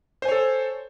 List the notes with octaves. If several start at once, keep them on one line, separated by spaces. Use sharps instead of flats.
A4 C5 C#5 G#5